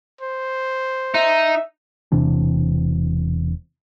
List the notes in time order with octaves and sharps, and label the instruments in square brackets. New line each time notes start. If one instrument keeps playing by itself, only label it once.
[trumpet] C5
[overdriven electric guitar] D#4 [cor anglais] E5
[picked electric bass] E1 C3 E3 D4